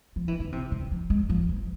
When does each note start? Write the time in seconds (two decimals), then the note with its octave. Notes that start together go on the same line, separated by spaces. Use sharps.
0.16 F3
0.28 E3
0.39 D3
0.52 C3
0.72 D3
0.92 F3
1.10 G#3
1.29 F3
1.49 E3